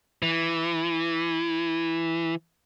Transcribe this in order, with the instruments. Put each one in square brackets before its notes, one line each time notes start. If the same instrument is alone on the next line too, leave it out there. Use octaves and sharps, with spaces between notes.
[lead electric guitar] E3